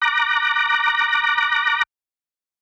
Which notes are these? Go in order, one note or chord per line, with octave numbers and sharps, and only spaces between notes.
A#5 D6 F#6 A#6